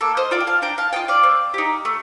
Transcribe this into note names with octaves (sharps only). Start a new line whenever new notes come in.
A#3 A4
C5 D#5
F4 A4 D5 F5
G5
F5 A5
D4 G5 A#5
F5 A5
F4 A4 D#5 G5
D5 F5
C4
D#4 G4
A3